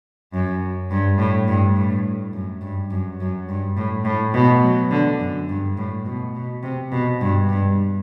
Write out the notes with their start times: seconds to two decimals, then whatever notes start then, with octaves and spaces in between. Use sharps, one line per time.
0.33 F#2
0.91 G2
1.18 A2
1.48 G2
1.76 A2
2.33 F#2
2.62 G2
2.91 F#2
3.20 F#2
3.49 G2
3.77 A2
4.05 A2
4.34 B2
4.63 F#3
4.91 D3
5.20 F#2
5.49 G2
5.78 A2
6.06 B2
6.35 B2
6.63 C3
6.92 B2
7.21 G2
7.49 G2